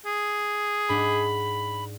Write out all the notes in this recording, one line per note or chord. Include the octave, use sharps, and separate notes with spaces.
G#4
G#2 D4 F#5 B5